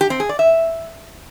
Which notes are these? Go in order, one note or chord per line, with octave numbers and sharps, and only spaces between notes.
G4
C4
G#4
D5
E5